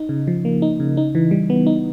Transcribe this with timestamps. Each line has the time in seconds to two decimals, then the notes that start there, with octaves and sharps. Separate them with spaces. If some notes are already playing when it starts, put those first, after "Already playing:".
Already playing: D#4
0.09 C#3
0.27 F3
0.45 A#3
0.62 D#4
0.80 C#3
0.97 D#4
1.15 E3
1.31 G3
1.50 B3
1.66 D#4